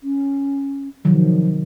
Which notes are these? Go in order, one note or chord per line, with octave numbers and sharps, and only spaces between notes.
C#4
C3 D#3 F3 F#3